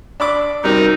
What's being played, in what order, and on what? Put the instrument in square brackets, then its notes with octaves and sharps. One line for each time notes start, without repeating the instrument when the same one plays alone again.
[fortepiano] D4 B5 D6
[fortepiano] C3 C4 [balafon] G3 C#4 F#4 [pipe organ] D#4 [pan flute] A#4